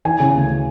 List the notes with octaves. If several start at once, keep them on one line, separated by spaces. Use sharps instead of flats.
E3 G#5
C#3
D2